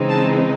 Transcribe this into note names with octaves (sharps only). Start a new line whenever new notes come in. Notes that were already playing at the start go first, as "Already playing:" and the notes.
Already playing: C#3 E3 G#3 C4 D#4
A5